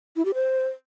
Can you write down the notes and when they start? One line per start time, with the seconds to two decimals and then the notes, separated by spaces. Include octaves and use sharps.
0.16 E4
0.25 G4
0.34 C5